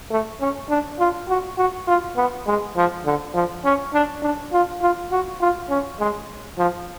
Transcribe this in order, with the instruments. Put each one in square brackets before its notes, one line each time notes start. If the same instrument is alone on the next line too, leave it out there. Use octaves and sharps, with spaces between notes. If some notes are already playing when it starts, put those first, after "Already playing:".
[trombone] A3
C#4
D4
F4
F#4
F#4
F4
B3
G#3
F3
D3
F3
C#4
D4
D4
F4
F4
F#4
F4
C#4
G#3
F3